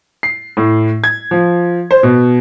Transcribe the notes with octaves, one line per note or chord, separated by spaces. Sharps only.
C7
A2
G#6
F3
C5
B2